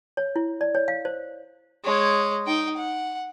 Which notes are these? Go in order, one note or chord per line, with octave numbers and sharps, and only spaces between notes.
C#5
E4
D5
C#5
F5
C5
G#3 C#5
D#4 G5
F#5